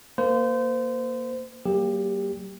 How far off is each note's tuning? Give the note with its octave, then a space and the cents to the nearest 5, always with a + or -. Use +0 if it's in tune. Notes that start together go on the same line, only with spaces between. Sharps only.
A#3 +0 C5 -30
F#3 +45 A#3 +0 G4 +20